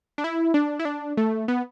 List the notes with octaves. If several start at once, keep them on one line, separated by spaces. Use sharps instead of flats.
D4
E4
D4
E4
D4
A3
B3